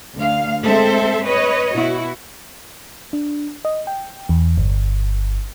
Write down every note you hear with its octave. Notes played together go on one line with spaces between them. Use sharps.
D2 F5
G#3 C4 A4 C5 E5
B4 C#5 D#5
B2 E4 F#4
D4
D#5
G5
E2
G1